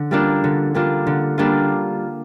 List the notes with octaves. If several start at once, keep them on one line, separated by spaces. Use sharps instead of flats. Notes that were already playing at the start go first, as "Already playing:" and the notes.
Already playing: D3
G3 A#3 D4 F4
D3
G3 A#3 D4 F4
D3
G3 A#3 D4 F4